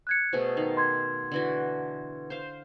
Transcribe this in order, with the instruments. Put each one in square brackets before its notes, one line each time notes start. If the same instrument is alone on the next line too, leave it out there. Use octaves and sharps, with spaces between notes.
[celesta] F#6 G#6 C#7
[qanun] B2 A3 G#4 [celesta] C5
[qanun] D#3 F5
[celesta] C6 G#6
[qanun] D3 E3 F#4
C5 F5